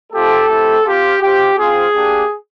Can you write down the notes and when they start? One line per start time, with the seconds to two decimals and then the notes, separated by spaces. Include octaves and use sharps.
0.12 A3 C4 F4 G4 A4
0.48 A3 C4 E4 G4
0.85 C4 F4 G4
1.21 G#3 C4 F4 G4
1.57 C4 F4 G#4
1.94 A#3 D4 G4